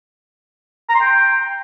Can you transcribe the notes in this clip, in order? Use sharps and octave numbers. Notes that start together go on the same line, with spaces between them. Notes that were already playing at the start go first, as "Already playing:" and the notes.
A#5
C6
G5